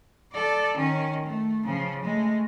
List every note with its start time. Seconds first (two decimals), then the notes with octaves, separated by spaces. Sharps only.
0.32 A4 D5
0.76 D#3 C#4
1.25 A3
1.64 C#3 F3
2.03 G#3 A3